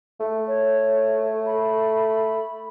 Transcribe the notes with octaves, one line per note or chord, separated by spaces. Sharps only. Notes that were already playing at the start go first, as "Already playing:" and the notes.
A3
C#5
B5